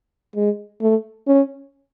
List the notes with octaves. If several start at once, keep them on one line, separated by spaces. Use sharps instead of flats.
G#3
A3
C#4